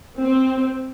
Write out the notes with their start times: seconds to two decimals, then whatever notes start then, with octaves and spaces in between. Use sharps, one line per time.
0.20 C4